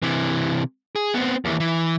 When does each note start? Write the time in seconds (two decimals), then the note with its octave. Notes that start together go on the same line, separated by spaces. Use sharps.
0.02 C3 E3
0.96 G#4
1.14 B3 C4
1.45 D#2 E3
1.60 E3